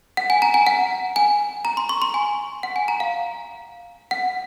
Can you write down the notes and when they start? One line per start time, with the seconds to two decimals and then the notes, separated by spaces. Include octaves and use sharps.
0.17 F#5
0.30 G#5
0.42 A#5
0.54 G#5
0.67 F#5
1.16 G#5
1.65 A#5
1.77 C6
1.89 C#6
2.02 C6
2.14 G#5
2.63 F#5
2.76 G#5
2.88 A#5
3.00 F5
4.11 F#5